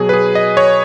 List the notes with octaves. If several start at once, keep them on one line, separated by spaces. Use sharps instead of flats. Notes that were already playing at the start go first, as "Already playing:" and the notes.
Already playing: B2 F#3 G#4
B4
G#4
D#5
C#5